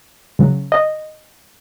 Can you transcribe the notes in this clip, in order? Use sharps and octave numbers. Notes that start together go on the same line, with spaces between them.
C#3 F#3
D#5